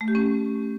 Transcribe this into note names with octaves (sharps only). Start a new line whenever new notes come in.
A3
G4
C#4